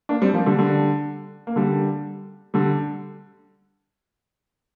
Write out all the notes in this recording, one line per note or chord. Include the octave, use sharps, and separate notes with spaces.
A#3 D4
G3 C4
F3 A#3
D3 G3
D3 G3
A#3
D3 G3
D3 G3